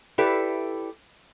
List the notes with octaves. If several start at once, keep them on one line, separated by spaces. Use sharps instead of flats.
E4 G4 A4 B4 D5